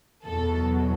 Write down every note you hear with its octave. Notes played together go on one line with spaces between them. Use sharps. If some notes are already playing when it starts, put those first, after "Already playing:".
E2 B2 F#3 A4